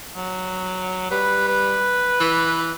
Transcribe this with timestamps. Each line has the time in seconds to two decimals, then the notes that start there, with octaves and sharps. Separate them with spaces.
0.16 F#3
1.11 G3 B4
1.48 B4
2.20 E3